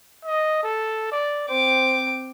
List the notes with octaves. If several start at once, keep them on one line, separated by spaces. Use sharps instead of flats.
D#5
A4
D5
C4 C5 D6